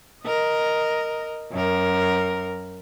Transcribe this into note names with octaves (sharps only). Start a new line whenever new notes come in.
A#4 D#5
F#2 A#4